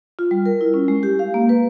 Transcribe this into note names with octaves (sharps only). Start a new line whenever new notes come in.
F4
G3
A#4
E4
C#4
G#3
G4
F5
A#3
B4